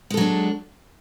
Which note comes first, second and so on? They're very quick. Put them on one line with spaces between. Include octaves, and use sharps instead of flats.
G#3 A4 F#3 D4